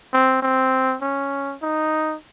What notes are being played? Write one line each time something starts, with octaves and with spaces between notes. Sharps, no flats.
C4
C4
C#4
D#4